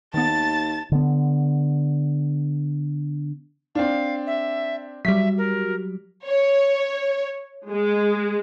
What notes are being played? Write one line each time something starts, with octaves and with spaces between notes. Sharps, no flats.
D#2 D#3 B3 A5 A6
D3 B3
C4 D4 F5
E5
F#3 G3 E5 B6
A#4
C#5
G#3